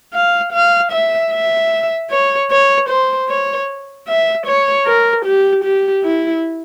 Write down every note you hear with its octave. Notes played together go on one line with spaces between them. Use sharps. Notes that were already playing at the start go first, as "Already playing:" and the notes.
F5
F5
E5
E5
C#5
C#5
C5
C#5
E5
C#5
A#4
G4
G4
E4